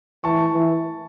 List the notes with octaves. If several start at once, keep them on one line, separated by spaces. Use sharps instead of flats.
E3 A5 C#6
E3